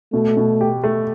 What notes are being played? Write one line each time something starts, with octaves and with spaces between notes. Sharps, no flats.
B2 A3
B2
G4
A3